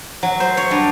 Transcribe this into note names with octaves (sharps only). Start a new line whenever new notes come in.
F#3
C5
C#5
G2